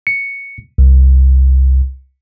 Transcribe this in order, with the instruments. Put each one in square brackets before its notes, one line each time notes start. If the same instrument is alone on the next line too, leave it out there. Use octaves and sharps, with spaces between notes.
[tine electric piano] C#7
C2